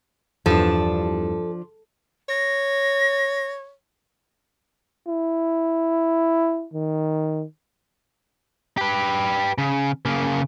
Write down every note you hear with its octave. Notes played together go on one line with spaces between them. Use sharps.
E2 G2 F3 D4 A4
C#5 A#6
E4
D#3
G4 B4
C#3
C#3 A#3